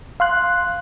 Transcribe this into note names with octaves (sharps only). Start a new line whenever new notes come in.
F5 C6 F#6